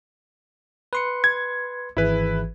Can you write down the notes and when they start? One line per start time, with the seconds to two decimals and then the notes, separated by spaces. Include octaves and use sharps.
0.93 B4 C6 C#7
1.24 G#6
1.97 G#1 E3 E4 G#4 B4